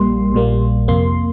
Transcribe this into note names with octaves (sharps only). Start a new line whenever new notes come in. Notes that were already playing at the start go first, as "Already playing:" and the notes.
Already playing: A#1 A#2 G3 A#3 C6
A#1 A#2 G3 A#3
F2 C3 A#3 C6